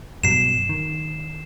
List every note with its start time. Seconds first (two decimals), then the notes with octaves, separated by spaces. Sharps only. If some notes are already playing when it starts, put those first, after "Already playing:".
0.24 G2 B2 F#3 C7 E7
0.69 D#3